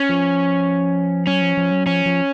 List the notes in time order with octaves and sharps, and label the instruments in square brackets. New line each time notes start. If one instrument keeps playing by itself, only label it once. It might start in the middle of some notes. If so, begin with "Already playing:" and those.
Already playing: [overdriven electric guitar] C#4
[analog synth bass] F3
[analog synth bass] F#3 [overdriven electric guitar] C#4
[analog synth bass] F3
F3
F#3
[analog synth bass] F3 [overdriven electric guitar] C#4
[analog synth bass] F3